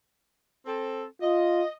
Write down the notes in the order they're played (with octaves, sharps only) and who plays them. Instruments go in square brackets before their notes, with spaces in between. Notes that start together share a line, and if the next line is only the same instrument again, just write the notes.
[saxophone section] C4 A4
[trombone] F4 [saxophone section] D#5